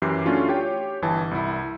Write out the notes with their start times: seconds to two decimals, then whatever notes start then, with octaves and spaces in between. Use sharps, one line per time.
0.02 F#2 E3 G4 C7
0.25 A3 C#4 D4 F4 F#4
0.49 G4 C#5 G5
1.02 G1 E3 A5
1.31 C2 E4